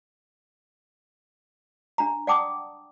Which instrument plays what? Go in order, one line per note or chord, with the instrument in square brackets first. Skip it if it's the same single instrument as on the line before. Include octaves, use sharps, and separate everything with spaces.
[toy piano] D4 A#5
D5 F#5 G5 A5 D6 D#6